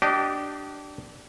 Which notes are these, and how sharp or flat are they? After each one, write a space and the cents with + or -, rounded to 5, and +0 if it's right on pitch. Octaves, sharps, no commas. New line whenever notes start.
D4 +0 G4 -25 D#5 +0